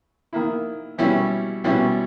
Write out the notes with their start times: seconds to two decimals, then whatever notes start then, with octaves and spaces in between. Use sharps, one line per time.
0.33 D#3 A#3 E4
0.98 B2 G3 C#4 E4
1.64 B2 G3 C#4 E4